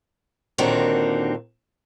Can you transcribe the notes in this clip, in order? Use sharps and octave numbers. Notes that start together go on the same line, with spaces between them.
D#2 A#2 D3 D#3 C4 F#4